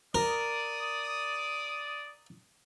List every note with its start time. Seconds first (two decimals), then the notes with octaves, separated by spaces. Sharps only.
0.15 A#4 D5 D#6